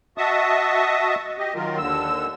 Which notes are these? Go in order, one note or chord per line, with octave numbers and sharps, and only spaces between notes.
F#4 D#5 E5 A5 C#6 D#6
G4 D#5
D#3 F#3 F4 A#4
D#2 D3 E6